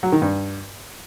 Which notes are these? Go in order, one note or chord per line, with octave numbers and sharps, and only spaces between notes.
F#3
D#3
G2